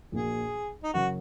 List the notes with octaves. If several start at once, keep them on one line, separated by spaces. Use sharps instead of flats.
A#1 A#2 A#3 F#4 G#4
D#4
F#1 F#2 F#3 C#4 F#4 A#4